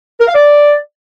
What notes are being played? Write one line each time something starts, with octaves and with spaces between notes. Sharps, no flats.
A#4
F5
D5